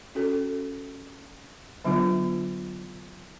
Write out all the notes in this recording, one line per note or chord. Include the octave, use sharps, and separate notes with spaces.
C#4 F#4 A4
D3 F#3 B3 D4 F4